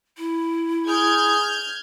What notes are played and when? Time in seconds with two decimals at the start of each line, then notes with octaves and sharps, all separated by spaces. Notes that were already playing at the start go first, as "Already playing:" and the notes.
0.18 E4
0.87 G#4 F6 G6 G#6